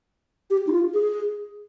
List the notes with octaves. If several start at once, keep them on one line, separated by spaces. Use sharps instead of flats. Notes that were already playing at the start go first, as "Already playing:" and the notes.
G4
D#4
F4
G#4